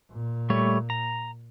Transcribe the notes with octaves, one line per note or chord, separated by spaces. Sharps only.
A#2
G3 A3 C#5
A#5